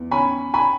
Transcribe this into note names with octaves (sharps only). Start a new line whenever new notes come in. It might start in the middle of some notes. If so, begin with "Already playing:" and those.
Already playing: E2
C#4 G#5 B5
G#5 B5